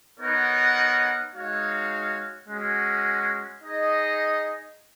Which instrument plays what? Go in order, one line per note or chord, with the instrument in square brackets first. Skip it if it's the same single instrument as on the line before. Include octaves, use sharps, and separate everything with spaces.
[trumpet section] B3 D#4 A#4 C#5 F#5
G#3 D#4 F#4 C#5 F5
G#3 C#4 F#4
D#4 G#4 D#5